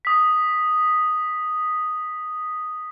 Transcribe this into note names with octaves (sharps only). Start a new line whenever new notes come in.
D#6 B6